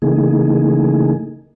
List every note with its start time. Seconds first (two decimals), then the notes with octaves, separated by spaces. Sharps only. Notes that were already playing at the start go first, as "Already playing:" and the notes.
0.02 C#3 E3 A3 A#3 D#4 G#4